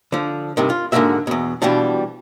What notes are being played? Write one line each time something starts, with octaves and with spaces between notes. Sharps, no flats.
D3 F3
G2 C3 D#3
F4
G#2 D3 G#3 A#3 F#4 E5
E2 B2
B2 E3 F3 G3 D4